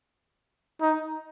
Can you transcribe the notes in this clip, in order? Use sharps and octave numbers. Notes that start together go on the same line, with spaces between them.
D#4